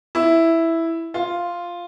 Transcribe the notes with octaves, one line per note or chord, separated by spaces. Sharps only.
E4
F4